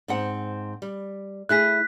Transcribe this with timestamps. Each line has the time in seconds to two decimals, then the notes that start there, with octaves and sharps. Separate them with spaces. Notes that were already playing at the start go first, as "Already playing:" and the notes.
0.08 G#2 C4 F#5
0.82 G3
1.49 A3 E4 G#4 F#6 B6